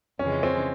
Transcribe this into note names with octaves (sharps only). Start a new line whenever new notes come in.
F2 C#3 E3 G#3 C#4
C4